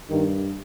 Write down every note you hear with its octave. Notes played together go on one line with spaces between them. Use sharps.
G2 D#3